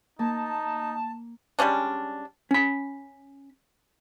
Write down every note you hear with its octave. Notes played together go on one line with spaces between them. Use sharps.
A#3 D#4 A5
G3 G#3 C#4 D4
C#4 B5